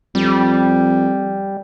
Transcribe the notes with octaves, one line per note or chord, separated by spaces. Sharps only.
F2 G3